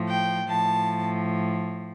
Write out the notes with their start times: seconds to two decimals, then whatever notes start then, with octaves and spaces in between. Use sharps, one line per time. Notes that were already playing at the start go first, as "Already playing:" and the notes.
Already playing: A2 F3
0.09 G5
0.48 A2 F3 A5